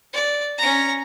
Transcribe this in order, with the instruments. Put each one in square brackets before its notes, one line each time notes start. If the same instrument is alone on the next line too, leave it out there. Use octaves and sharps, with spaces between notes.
[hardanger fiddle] D5
C#4 A#5